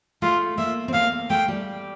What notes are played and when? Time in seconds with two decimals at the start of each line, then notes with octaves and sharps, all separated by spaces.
0.22 A3 F4
0.58 A#3 E5
0.88 C4
0.93 A#3 F5
1.12 A#3
1.30 A3 G5
1.48 G3